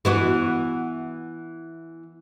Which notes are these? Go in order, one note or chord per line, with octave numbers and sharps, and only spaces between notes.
E3 B3 F#4